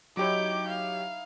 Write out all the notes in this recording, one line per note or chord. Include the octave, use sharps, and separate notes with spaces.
F#3 D#4 E4 G4 C#5 D6 G6
F5